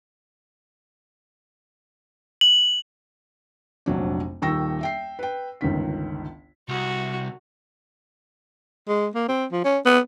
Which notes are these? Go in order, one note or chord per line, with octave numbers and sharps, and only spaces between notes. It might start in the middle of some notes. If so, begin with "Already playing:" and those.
F#7
F1 A#1 F#3 D4
D#1 D#3 G5 C#6 E6 A#6
E5 G5 C7
B4 G5
G1 C#2 D#3 B6
C2 F#4
G#3
A#3
C4
F3
C#4
B3